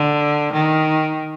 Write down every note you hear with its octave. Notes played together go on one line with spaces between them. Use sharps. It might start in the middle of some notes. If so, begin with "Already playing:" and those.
Already playing: D3
D#3